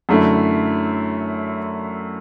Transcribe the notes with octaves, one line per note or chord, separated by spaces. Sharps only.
F#2 D3 A3 E4